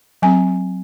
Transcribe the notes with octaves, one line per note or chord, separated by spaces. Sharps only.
F#3 C4 G#5